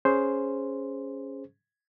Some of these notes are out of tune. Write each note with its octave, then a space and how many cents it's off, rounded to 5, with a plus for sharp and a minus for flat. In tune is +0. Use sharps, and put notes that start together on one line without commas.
C#4 +0 G#4 +0 C5 +0